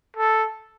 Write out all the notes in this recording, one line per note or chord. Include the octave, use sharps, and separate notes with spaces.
A4